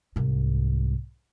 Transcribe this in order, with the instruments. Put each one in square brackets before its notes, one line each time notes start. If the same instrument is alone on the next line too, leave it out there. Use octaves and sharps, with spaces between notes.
[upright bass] C2 G#2